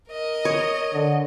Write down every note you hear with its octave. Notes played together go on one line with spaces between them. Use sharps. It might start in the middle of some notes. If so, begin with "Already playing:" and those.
A#4 D#5
C#5
D3